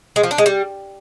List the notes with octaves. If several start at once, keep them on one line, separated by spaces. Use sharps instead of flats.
G#3
F3
D4
G#3
G3